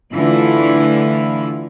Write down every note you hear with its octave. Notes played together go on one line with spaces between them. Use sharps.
D3 E3 A3 E4 F4